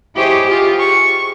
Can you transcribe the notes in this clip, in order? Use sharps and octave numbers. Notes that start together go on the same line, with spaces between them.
E4 G4 G#4 C5 C#5 D#5
F4 G4 G#4
C#6